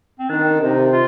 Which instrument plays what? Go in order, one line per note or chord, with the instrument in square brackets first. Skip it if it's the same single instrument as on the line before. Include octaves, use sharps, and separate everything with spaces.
[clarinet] C4
[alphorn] D#3 [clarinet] D4
[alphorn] C3 [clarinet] D#4
[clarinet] F4